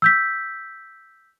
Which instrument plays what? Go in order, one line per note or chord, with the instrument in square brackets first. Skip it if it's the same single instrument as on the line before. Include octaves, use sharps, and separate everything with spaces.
[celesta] E6 G6 B6